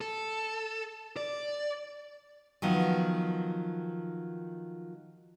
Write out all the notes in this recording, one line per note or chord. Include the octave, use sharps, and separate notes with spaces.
A4
D5
D#3 F3 F#3 B3